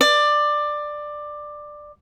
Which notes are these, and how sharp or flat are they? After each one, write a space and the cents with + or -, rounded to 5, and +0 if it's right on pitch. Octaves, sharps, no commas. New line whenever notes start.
D5 +15